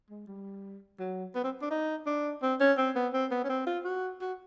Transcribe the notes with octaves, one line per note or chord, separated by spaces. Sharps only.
G#3
G3
F#3
B3
C4
D4
D#4
D4
C4
C#4
C4
B3
C4
B3
C#4
C4
F4
F#4
F#4